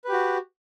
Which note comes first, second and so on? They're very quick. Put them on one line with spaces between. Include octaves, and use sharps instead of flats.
B4 G4 F#4